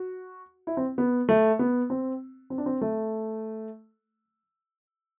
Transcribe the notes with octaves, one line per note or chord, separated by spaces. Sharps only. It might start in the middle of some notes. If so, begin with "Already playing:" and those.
Already playing: F#4
E4
C4
B3
A3
B3
C4
C4
D4
C4
A3